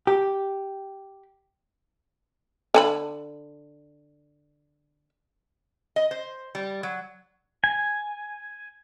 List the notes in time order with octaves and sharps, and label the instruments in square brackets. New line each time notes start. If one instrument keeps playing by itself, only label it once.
[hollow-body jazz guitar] G4
[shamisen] D3 G#5 B5
[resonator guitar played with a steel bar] D#5
C5
G3
F#3
[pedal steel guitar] G#5